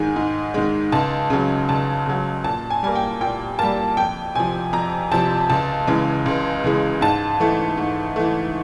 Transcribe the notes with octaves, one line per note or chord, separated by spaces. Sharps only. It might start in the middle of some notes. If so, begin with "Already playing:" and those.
Already playing: G#2 D#3 G#3 G#5
G#2
D#3 G#3
C#2 A5
C#3 F#3
C#2 A5
C#3 F#3
A#2 A5
G#5
G3 A#3 G#5
G5
A#2 G5
G3 A#3 A5
F2 G5
C3 F3 G#5
F2 A#5
C3 F3 A5
C#2 A5
C#3 E3 G#3
C#2
C#3 E3 G#3
G#2 A5
E3 A3
G#2
E3 A3